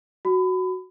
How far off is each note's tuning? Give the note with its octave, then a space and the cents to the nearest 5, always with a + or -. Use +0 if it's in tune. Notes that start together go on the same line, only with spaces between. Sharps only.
F#4 +0 B5 +30